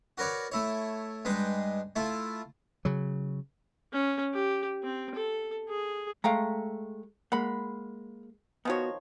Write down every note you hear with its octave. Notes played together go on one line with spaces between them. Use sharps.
F#4 A#4 B4 C#5 D5
A3 E4 C#5
G2 G#3 B4 G5
A3 E4 F4
C#3 F#3
C#4
G4
C4
A4
G#4
G#3 A3 F5 G5 A#5
G#3 A#3 F#5 B5
D#3 F3 B3 F#4 C#5